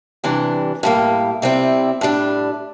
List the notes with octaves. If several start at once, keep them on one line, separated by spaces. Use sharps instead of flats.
C3 E3 G3 D4
A2 G3 A#3
C3 G3 C4 E4
A2 G3 D4